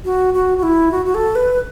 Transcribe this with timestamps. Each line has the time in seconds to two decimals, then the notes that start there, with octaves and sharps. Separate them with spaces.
0.05 F#4
0.34 F#4
0.58 F#4
0.63 E4
0.92 F#4
1.05 F#4
1.15 A4
1.35 B4